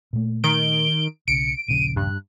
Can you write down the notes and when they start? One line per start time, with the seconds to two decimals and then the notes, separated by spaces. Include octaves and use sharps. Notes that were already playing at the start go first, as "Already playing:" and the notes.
0.13 A#2 A3
0.44 D#3 D7 G7
1.28 B1 C#3 C#7 D7
1.68 D#1 A#1 C#3 D#7
1.96 G2 F#6